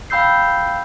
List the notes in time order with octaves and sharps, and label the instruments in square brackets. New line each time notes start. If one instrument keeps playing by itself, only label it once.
[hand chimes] F5 G5 B5 E6 G6 C7